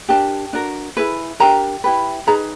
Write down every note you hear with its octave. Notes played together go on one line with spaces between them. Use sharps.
D4 G4 A#4 A5
D4 F#4 A#4
E4 G#4 B4
D4 G4 A#4 A#5
E4 G4 B4
D#4 G#4 B4 A#5